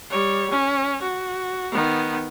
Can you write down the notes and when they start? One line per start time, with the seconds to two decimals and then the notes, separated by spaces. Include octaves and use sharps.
0.10 G3 C#5
0.50 C#4
1.02 F#4
1.72 D#3 B3